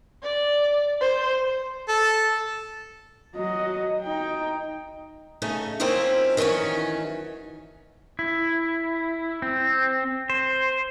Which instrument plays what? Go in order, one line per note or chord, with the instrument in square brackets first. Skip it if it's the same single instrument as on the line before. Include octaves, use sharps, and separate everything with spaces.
[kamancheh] D5
C5
[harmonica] A4
[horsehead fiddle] F#3 D#5
D#4 G5
[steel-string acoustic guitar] C#3 A3 C#4 D#4
F3 A#3 C4 C#4 D#4 E4
D#3 E3 F#3 A3 C#4
[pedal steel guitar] E4
C4
C5